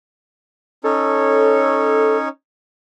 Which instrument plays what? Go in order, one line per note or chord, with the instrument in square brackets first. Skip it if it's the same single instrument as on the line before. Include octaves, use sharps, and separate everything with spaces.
[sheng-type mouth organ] C#4 D#4 C#5 [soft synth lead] A4